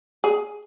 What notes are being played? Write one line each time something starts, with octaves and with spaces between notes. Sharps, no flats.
G#4